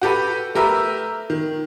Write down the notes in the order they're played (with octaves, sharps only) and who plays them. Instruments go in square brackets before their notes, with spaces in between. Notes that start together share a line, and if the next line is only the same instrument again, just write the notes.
[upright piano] F#4 G4 A4 B4
A3 G4 A#4 B4 E5
D#3